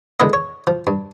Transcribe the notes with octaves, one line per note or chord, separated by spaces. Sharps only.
D3 G#3 B3 E4 D#5
C#5
F3
G2